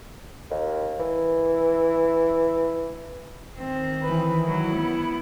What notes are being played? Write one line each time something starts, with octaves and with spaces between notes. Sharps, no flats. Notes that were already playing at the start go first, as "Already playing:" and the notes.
D#2
E3
D#3 C4
E3 B4
F#3 E4
B3